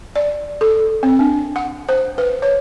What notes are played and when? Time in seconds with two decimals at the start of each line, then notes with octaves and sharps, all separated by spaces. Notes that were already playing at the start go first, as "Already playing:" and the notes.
0.16 D5
0.61 A4
1.03 C4
1.19 D4
1.56 F#5
1.89 C5
2.18 B4
2.42 C#5